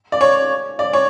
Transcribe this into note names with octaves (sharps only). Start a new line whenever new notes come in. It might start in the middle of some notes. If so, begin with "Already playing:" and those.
D5
C#5
D5
C#5